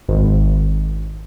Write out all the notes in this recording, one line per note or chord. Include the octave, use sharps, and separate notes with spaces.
G#1